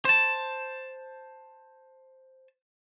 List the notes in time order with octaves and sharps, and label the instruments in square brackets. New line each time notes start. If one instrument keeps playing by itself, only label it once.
[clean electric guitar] C5 A5